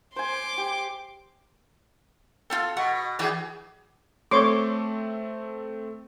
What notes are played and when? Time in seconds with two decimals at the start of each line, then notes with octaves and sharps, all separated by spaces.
0.16 C5 G#5 C6 D6
0.58 G4
2.50 F4 A4 F5 G5
2.77 B2 F#5 C#6
3.19 E3 F#4 G#4 D5 G5
4.31 A3 C4 A4 C#5 C6 D6